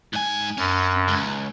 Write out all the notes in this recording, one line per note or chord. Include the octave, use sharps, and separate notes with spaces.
G#2 G#5
F#2 C#4
C#2